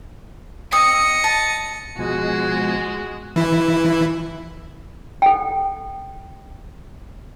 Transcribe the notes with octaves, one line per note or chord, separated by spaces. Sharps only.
C4 D#5 D#6 C#7
A5
B2 F3 G#3 F#4 G#5
E3 E4
A4 F#5 G5